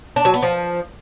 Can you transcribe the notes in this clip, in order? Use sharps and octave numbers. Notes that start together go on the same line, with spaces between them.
D4
F#3
B3
F3